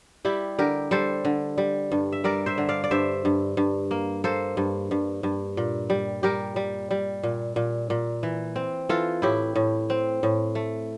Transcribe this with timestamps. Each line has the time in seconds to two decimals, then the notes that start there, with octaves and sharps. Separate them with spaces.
0.25 G3 E4 G4
0.59 D3 G4 A#4
0.91 G3 A4 C5
1.25 D3
1.58 G3
1.92 G2
2.12 E5
2.24 G3 A#4 D5
2.46 C5 E5
2.58 D3
2.69 D5 F5
2.84 D5
2.91 G2 C5 E5
3.25 G2
3.57 G2
3.91 A#3
4.24 A#3 A4 C5
4.57 G2
4.91 G2
5.23 G2
5.57 A#2
5.90 G3
6.23 G3 G4 A#4
6.56 G3
6.91 G3
7.23 A#2
7.56 A#2
7.90 A#2
8.23 E3
8.56 C4
8.89 E3 F4 A4
9.22 A2 E4 G4
9.56 A2
9.90 C4
10.23 A2
10.55 A3